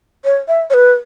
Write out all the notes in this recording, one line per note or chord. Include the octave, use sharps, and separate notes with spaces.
C#5
E5
C#5
B4